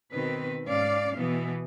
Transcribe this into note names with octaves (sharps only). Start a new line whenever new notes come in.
B2 D#3 C4 B4
G#2 C#4 D5 F5
B2 E3 B3